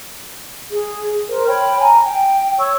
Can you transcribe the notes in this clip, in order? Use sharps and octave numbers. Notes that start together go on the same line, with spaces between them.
G#4
A#4 C5
C#5 G5 B5 F6
G#5 A#5
G5
C#5 C#6 E6